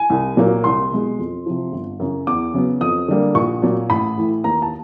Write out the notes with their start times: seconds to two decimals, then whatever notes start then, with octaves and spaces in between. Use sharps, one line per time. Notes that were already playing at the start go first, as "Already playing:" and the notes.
Already playing: G#5
0.10 C2
0.37 A#2 F#3 A#3
0.64 C2 C6
0.92 B2 G#3
1.19 F2
1.46 C3 F3
1.72 G1
2.00 F#2 C#3 F#3
2.27 E2 D6
2.54 C#3 F#3 B3
2.81 F2 D#6
3.08 D3 G3 A#3
3.35 A#1 C#6
3.62 A#2 F#3
3.90 A1 B5
4.18 A2 E3
4.44 D#2 A#5
4.62 A5